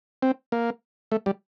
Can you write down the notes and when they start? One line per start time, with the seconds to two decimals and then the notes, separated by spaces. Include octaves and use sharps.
0.23 C4
0.52 A#3
1.12 A3
1.26 G3